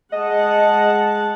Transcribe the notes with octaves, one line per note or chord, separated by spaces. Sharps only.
G#3 D#5 F#5 A5